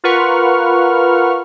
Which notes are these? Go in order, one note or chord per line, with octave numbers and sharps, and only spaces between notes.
F4 A#4 B4 F#5 C#6 F6